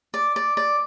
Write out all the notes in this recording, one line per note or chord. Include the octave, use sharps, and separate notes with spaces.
D5
D5
D5